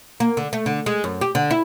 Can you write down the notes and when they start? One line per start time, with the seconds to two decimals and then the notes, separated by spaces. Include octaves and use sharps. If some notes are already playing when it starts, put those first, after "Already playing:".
0.20 A#3
0.37 D3
0.53 A3
0.66 D3
0.86 G#3
1.04 F#2
1.21 G4
1.35 D3
1.51 E4